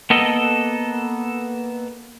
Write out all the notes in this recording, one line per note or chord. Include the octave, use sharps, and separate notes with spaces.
A#3 B3 A4 D#5